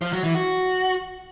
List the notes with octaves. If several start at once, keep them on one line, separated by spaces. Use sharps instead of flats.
F3
F#3
E3
F#4